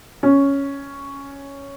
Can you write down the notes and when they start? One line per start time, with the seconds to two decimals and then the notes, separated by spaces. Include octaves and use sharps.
0.23 C#4